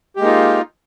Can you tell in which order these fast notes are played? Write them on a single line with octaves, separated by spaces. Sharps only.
G4 G#3 A#3 D#4 F4